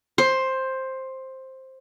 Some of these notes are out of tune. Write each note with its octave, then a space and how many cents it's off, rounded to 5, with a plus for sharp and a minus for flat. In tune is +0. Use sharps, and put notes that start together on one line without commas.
C5 +10